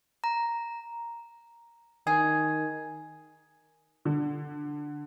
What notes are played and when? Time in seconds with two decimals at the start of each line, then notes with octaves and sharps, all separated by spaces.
0.24 A#5
2.07 D#3 G#4
4.05 D3